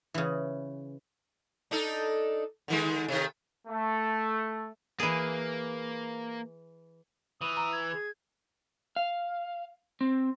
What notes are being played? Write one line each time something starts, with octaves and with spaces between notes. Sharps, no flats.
C#3 E3
D4 D#4 A4
D3 D#3 G#3
C3 D#3
A3
E3 A#3 G#4
E3 D#6
A#5
G#6
G#4
F5
C4